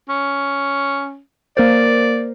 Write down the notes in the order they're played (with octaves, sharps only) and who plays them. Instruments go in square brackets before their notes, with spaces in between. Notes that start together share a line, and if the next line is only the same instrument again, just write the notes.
[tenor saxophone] C#4
[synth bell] A#3 A#4 C5 [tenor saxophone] D5